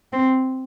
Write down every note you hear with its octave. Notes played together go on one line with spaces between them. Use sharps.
C4